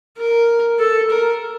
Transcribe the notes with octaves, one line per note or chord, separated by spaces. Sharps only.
A#4
A4
A#4